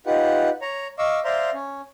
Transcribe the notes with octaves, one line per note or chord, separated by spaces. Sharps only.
D#4 F4 G4 B4 F#5
C#5 A#5
D#5 F5 C#6 D6 E6
C5 D5 E5 F5 A#5 C6
C#4